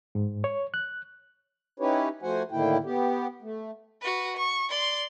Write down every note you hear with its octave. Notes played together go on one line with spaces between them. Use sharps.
G#2
C#5
F#6
C#4 D#4 E4 G4 B4 C#5
F3 A3 F#4 C5 F#5 G#5
A2 D3 D#3 A#3 E4 G5
B3 G4
A3
F#4 B4
C#6
D5 C6